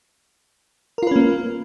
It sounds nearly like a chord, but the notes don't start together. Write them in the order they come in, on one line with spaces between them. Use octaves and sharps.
A#4 F4 B4 C#4 A#3